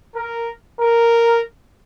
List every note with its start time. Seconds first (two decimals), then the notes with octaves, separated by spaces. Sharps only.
0.15 A#4
0.80 A#4